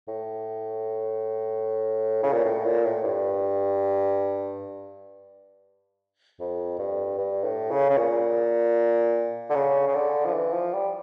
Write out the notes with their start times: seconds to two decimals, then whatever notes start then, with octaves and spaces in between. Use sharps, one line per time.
0.08 A2
2.23 C#3
2.33 A#2
2.45 A2
2.65 A#2
2.85 A2
3.04 G2
6.40 F2
6.79 G2
7.18 G2
7.44 A2
7.71 C#3
7.90 C#3
7.97 A#2
9.50 D3
9.55 C#3
9.88 C#3
9.95 D3
10.25 F3
10.33 E3
10.53 F3
10.74 G3